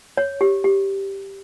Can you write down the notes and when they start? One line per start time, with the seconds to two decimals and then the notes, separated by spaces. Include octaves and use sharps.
0.17 C#5
0.41 G4
0.64 G4